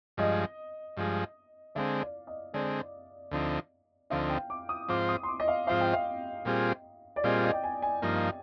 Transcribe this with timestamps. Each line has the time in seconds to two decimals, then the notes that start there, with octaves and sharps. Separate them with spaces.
0.17 G2 F3 G#3 D#5
0.97 G2 F3 G#3
1.75 D3 G#3 C4 F5
2.01 D5
2.27 D#5
2.54 D3 G#3 C4 D5
3.31 D2 D3 F3 C4 D#4
4.10 D2 D3 F3 C4 D#4 F5
4.29 G5
4.50 D6
4.69 D#6
4.88 G#2 F3 C4 F4 C5 D6
5.09 D#6
5.23 C6
5.28 D6
5.40 D#5
5.48 F5
5.67 G#2 F3 C4 F4 C5 F5
5.81 G5
5.93 F5
6.45 A#2 G3 C4 F4 G#4
7.16 D5
7.24 A#2 G3 C4 F4 G#4 D#5
7.44 D#5
7.53 G5
7.64 G#5
7.82 G#5
8.02 G2 F3 A#3 D#4